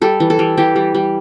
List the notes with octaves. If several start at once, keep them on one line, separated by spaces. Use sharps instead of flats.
G3 A4
E3
A4
G3
E3 G4
G3
G3